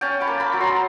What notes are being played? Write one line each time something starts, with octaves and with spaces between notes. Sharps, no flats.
C#4 G5 A5
A5 B5
A#3
A5 B5
F#3
A#5 C6